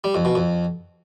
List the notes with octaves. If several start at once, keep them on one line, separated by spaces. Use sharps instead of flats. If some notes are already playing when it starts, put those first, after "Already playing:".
G3
F2
B2
F2